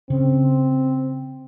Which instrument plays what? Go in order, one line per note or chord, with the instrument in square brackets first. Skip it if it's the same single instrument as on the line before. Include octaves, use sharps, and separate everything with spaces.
[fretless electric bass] C#3 [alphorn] C4